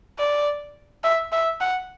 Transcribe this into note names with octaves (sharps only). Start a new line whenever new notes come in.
D5
E5
E5
F#5